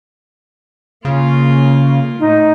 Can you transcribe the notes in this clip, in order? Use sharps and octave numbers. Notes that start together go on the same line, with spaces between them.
C#3 A#3 F4
A2 D#4